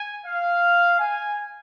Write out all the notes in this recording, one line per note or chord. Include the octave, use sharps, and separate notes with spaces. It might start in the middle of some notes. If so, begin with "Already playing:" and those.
Already playing: G#5
F5
G#5